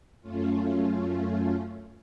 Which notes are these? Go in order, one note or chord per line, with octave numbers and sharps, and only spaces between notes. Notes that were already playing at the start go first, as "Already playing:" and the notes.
F#2 A3 C#4 F4